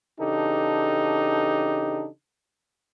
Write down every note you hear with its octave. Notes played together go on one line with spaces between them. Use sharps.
C#3 E3 D4 D#4 G4 A4